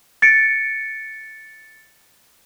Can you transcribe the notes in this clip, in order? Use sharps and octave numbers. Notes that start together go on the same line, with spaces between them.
A6 C#7 D7